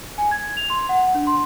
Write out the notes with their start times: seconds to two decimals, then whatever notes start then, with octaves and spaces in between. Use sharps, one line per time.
0.18 G#5
0.31 G#6
0.57 F7
0.70 C6
0.89 F#5
1.14 D4
1.27 C6